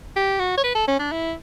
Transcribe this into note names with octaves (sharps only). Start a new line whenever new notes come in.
G4
F#4
C#5
B4
A4
C#4
D4
E4